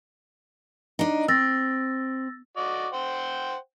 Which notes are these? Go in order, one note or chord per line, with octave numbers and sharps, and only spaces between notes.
D4 D#4
C4 E6 A6 A#6
F#4 D5 D#5
C5 F#5 G5